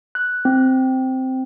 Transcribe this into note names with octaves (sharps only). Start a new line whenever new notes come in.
F#6
C4